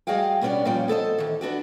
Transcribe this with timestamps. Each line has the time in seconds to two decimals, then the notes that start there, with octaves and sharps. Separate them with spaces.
0.07 G3 F#4 G#4 D#5 F5 G5
0.41 B2 G3 B3 C#4 D4 D5
0.65 E2 A#2 F3 G3 C#4 G5
0.88 B3 A4 C5 D#5
1.18 D#3 E3
1.41 B3 D4 F#4 G4